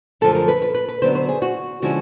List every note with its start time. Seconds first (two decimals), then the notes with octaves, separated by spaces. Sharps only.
0.21 F#2 D3 F3 A3 A4
0.35 A#4
0.48 B4
0.62 B4
0.75 B4
0.89 B4
1.02 D3 F#3 B3 D4 C5
1.15 C5
1.28 G#4
1.42 F#4
1.82 D3 F3 G#3 C#4 E4 F#4